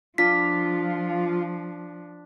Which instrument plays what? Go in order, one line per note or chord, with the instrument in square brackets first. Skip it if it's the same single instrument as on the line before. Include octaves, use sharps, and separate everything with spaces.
[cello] F3 [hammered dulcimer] D4 [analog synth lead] F4 [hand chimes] B6